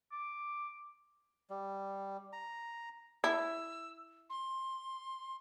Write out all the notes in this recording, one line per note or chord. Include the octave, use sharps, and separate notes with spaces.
D6
G3
A#5
E4 E6
C6